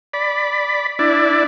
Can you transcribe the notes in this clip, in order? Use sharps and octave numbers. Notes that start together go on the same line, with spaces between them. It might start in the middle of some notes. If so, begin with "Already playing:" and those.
D5 B5
D4 E4 D5